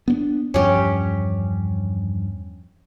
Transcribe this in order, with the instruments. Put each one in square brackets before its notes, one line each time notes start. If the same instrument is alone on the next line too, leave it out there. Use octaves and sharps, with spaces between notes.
[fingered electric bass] B3 C#4 D4
[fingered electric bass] E2 G2 F3 [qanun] C#4 G4